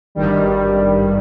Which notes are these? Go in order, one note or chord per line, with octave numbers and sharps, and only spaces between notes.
G#1 G2 D#3 G3